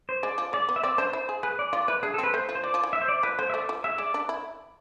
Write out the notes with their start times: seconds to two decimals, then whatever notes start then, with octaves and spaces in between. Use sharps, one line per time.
0.09 C5
0.23 G#3 D5
0.38 F3
0.53 G#3 D5
0.69 B3
0.76 E5
0.83 C4 D5
0.98 D4 C5
1.13 E4 C5
1.29 G#4
1.43 G#4 B4
1.59 D5
1.73 F4 D5
1.88 E4 B4
2.03 D4 G#4
2.14 A4
2.18 C4
2.23 B4
2.34 A3 C5
2.49 F3
2.55 C5
2.63 F3 D5
2.74 F3
2.83 E3
2.93 E5
3.01 C5
3.08 D5
3.23 F3 B4
3.39 A3 C5
3.50 E5
3.53 A3 D5
3.69 F3
3.84 G#3 E5
3.98 G#3 D5
4.14 D4
4.29 E4